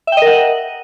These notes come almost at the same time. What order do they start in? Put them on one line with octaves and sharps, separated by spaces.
E5 G5 D#5 A#4 F#5